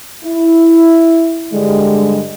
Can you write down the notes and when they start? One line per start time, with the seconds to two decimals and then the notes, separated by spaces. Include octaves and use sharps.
0.25 E4
1.53 G2 D3 G3 G#3